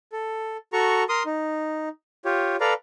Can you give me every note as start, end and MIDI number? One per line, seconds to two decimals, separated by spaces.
0.12 0.57 69
0.73 1.04 66
0.73 1.04 69
0.73 1.04 82
0.73 1.04 85
1.09 1.23 70
1.09 1.23 84
1.09 1.23 87
1.26 1.89 63
2.25 2.56 65
2.25 2.56 67
2.25 2.56 73
2.60 2.73 69
2.60 2.73 71
2.60 2.73 74
2.60 2.73 77
2.60 2.73 82